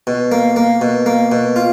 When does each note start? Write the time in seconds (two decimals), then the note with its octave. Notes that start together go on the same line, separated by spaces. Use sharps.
0.07 B2
0.32 A#3
0.56 A#3
0.81 B2
1.06 A#3
1.32 B2
1.56 F4